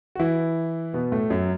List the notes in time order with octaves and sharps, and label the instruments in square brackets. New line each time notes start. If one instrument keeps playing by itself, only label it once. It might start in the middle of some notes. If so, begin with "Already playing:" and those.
[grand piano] F#4
E3 E4
B2 B3
A2 A3
F#2 F#3